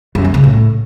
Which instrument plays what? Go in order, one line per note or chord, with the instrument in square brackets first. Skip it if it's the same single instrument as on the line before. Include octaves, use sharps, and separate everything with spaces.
[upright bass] F#2
E3
C#3
A2